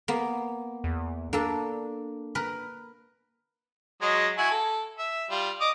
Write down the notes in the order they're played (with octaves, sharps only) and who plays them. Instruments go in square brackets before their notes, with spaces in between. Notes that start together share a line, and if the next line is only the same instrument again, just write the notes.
[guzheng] A#3 B3
[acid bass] E2
[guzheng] A#3 A4 [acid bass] D4
[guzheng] A#4 B4
[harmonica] F#3 G#3 D#5
E4 F#4 G#5
A4
E5
G3 F4
D#5 D6 D#6